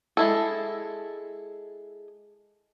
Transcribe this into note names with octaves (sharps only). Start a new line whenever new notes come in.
G#3 E4 A4